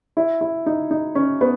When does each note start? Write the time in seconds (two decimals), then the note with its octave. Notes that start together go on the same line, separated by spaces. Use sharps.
0.17 E4
0.41 E4
0.66 D#4
0.91 D#4
1.15 C#4
1.41 B3